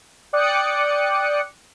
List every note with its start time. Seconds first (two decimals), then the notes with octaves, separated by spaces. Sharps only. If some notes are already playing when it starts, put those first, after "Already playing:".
0.33 D5 G5 D6 D#6 F#6 C#7